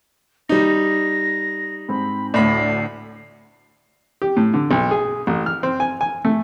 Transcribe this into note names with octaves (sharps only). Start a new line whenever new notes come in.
G3 D#4 A#6
G#2 C4 B5
D2 A2 D5 B5 C7
G4
A2
D3
B1
G#4
A1
F6
C4
G#5
G#5
A3